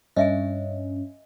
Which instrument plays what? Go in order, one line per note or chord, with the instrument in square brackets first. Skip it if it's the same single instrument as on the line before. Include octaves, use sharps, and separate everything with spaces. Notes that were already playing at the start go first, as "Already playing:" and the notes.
[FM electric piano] G2 C#4 [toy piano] D#5 E5 G#5